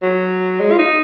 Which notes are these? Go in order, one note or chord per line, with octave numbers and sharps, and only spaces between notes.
F#3
G#3
F4
D#4